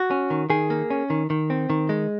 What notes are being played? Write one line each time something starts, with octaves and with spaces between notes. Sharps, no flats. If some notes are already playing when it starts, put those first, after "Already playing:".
Already playing: F#4
C#4
D#3
D#3 G#4
A#3
C#4
D#3
D#3
C4
D#3
G#3